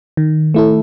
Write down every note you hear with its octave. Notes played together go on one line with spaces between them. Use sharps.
D#3
A3 E4 A4